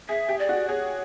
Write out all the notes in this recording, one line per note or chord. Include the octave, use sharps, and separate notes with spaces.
G#4 E5
G4
D5
F#4
G#4 C#5